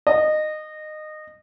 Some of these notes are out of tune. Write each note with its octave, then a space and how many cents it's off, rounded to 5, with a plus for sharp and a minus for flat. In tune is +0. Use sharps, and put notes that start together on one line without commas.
D#5 -20